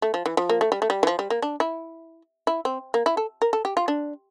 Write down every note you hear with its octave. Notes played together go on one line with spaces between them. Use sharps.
A3
F3
E3
F3
A#3
A3
G3
A3
G3
E3
F3
G3
A#3
D4
E4
E4
C4
A#3
E4
A4
A#4
A4
G4
F4
D4